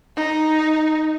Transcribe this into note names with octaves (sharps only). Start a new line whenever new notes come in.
D#4